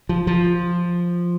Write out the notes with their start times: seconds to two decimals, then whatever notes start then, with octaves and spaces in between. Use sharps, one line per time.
0.09 F3
0.27 F3